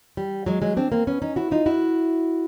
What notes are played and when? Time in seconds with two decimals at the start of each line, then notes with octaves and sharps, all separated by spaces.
0.17 G3
0.46 F#3 G#3
0.62 F#3 G#3
0.77 C4 D4
0.92 A#3 C4
1.07 B3 C#4
1.22 C#4 D#4
1.36 E4 F#4
1.51 D#4 F4
1.66 E4 F#4